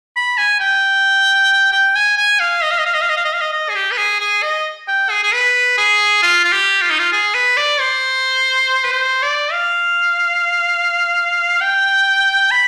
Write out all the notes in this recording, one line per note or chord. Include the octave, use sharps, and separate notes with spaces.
B5
G#5
G5
G5
G#5
G#5
F5
D#5
F5
D#5
F5
D#5
F5
D#5
F5
D#5
F5
D#5
D#5
G#4
G4
B4
G#4
G#4
D#5
G5
G#4
G#4
B4
G#4
F4
F4
G4
F4
D#4
F4
G#4
B4
D5
C5
B4
C5
D5
F5
G5
B5